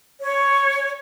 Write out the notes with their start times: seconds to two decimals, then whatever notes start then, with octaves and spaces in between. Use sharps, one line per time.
0.21 C#5